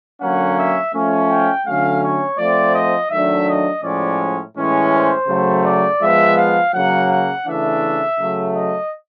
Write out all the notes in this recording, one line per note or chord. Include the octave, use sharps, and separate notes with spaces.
D3 F#3 A#3 C#4 F#5
E5
F3 A3 C#4
G5
D3 F#3 A3 C#4 F5
C#5
F3 A3 C4 D5
D#5
D#3 F#3 A3 D4 E5
D#5
A2 F3 G#3 C#4 D5
A2 E3 G#3 C#4
C5
C#3 F#3 A3
D5
F3 G#3 B3 E5
F5
C#3 F#3 A#3 F#5
F#5
C#3 E3 A3 D4 E5
C#3 F#3 A3
D#5